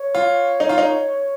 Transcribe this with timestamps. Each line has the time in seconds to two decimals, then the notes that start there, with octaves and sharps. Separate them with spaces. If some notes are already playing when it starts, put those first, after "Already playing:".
Already playing: C#5
0.15 F4
0.60 D#4
0.69 F4
0.78 D#4